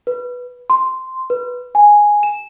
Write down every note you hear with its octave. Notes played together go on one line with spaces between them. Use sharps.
B4
C6
B4
G#5
E7